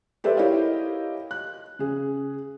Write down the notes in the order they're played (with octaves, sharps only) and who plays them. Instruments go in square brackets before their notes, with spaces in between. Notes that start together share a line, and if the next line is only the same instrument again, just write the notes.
[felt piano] G4 A4 B4 C5 D5 E5
E4 G4 A#4 C#5 D#5 F5
F#6
C#3 G#4